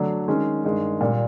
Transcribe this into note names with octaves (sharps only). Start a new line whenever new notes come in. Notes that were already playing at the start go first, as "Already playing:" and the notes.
Already playing: D3 F#3 A3 D4
D#3 G#3 C#4
G2 D#3 G#3
A#2 G3 A#3